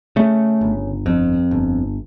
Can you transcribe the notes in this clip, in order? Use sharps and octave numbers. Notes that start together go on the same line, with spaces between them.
C#3 A3
G1
F2
G1